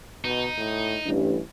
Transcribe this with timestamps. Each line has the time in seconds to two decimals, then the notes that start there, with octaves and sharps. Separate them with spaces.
0.25 B2 D#4
0.58 A2
1.06 A1 G2 E3